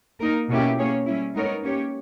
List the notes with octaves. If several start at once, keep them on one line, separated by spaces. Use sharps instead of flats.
A#3 D#4 A#4
B2 A#3 C#4 E4 G4
A#3 C#4 G#4 C#5
G3 C#4 E4
G#3 B3 D#4 A#4 C#5
A#3 C#4 G4 C#5